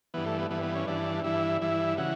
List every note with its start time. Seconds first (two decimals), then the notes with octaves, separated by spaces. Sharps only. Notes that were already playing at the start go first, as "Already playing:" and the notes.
0.14 G2 E3 B3
0.26 A3
0.38 B3
0.50 G2 E3 B3
0.63 B3
0.75 C#4
0.87 G2 E3 D4
1.24 G2 E3 E4
1.62 G2 E3 E4
1.98 C#3 E3 F#4